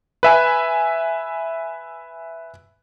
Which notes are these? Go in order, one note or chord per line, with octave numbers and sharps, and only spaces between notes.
B4 E5 G#5